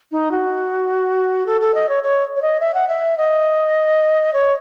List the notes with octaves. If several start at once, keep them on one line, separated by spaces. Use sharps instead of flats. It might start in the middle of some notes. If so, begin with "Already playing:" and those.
D#4
F#4
A4
A4
D#5
C#5
C#5
C#5
D#5
E5
F#5
E5
D#5
C#5